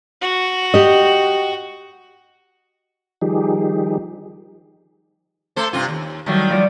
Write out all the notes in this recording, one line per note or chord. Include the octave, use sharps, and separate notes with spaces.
F#4
G4 D#5
D#3 F3 G3 D#4 G4 G#4
A3 A4 C5
G2 C3 F4
D#2
D#3 F#3 G3 A3 E4
F3 G3 D5